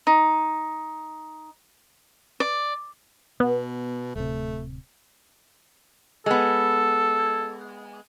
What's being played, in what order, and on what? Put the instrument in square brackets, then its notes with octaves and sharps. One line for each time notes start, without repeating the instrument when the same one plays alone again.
[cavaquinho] D#4
D5
[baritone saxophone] B2 [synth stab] B3
[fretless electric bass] D1 C3 [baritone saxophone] A3
[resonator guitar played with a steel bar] G#3 B3 [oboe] A4